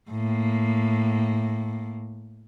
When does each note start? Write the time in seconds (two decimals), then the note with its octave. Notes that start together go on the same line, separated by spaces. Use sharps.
0.11 A2 A#3